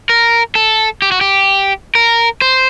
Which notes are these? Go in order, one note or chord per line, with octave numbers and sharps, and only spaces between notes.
A#4
A4
G4
F#4
G4
A#4
C5